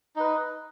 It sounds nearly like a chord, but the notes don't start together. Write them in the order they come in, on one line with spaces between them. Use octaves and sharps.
D#4 B4 D#5